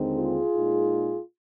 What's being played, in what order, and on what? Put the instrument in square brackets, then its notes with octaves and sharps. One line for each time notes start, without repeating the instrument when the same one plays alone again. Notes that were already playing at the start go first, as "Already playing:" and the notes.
Already playing: [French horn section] D#2 D3 G#3 C4 D#4
F4 G#4
A#2 G#3 D#4